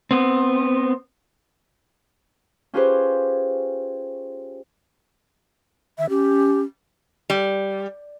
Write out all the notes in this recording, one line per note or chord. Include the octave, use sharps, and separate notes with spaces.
B3 C4
C#4 F4 G4 G#4 B4 C5
D#3 E5
C#4 G4
G3